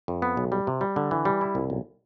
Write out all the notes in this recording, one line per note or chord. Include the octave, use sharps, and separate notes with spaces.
F2
B3
B1
G3
C3
G3
D3
E3
G3
E4
C2
B1